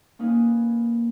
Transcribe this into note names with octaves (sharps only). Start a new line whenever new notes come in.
A#3 C#4 D#4 B4 G#5